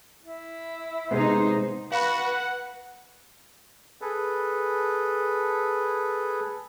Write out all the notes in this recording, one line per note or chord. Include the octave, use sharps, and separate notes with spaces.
E4
C3 G#3 B3 D#4 C5
F#4 B4 F5 F#5 B5
G#4 A4 B4